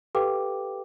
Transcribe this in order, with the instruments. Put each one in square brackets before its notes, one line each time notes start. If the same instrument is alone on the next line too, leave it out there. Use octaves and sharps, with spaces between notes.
[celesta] G4 A4 B4 F5 G5 D6